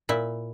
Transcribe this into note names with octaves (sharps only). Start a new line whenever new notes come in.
A#2 E4